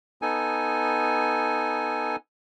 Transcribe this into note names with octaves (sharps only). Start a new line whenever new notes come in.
B3 D#4 A4 G#5